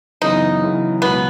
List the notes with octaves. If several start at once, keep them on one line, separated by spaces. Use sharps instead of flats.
F#2 C#3 E3 B3 D#4
F#2 C#3 E3 B3
C#2 B2 F#3 B3